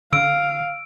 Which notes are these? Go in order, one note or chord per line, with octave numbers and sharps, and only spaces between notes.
D3 F5 E6 D7